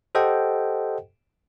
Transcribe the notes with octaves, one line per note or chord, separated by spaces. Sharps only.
G4 A4 C5 D#5 F#5 G5